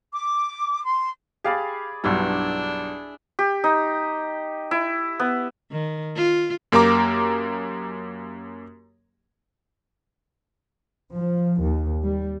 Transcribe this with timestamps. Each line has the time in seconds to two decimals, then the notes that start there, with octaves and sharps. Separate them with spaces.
0.13 D6
0.85 C6
1.44 G4 G#4 D5 F5 B5
2.04 B1 G2 D4 E4
3.39 G4
3.64 D#4
4.71 E4
5.20 B3
5.71 D#3
6.16 F4
6.72 F#2 A#3 G4 A#4 A#5 D6
11.13 F3
11.61 D#2
12.04 G3